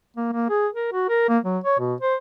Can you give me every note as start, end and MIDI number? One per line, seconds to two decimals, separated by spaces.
0.17 0.28 58
0.33 0.48 58
0.50 0.67 68
0.74 0.91 70
0.93 1.08 66
1.09 1.28 70
1.29 1.38 58
1.44 1.58 54
1.64 1.77 73
1.79 1.95 47
2.01 2.15 72